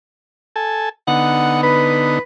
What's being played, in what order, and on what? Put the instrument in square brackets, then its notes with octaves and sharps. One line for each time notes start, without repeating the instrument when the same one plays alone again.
[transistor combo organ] A4 G#5 A5
[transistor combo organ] D3 B3 D#4 [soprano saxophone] F#5
[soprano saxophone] B4